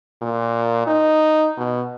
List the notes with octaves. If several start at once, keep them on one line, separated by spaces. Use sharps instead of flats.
A#2
D#4
B2